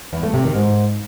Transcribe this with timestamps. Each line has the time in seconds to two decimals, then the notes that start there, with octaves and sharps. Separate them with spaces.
0.13 E2
0.23 A3
0.34 C3
0.44 D#3
0.54 G#2